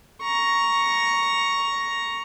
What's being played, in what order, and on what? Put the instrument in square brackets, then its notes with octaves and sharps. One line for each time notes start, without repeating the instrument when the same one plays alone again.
[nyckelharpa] A#5 C#6